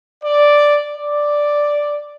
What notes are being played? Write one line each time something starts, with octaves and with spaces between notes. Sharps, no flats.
D5
D5